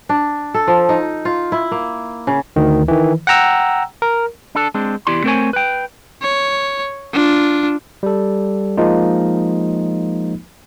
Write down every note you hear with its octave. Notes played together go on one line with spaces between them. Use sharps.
D4
A4
F3
D#4
F4
E4
A#3
C#3
D2 D#3
D#3 E3
F#5 G5 A#5 E6
A#4
D4 A4
G#3 C4 D4
E2 E4 G4 D5 C6
A3 C4 A#4 C5 C#5 G#5
B4 G5
C#5
D4 F4
G3 A4
F3 G#3 A#3 D#4 F4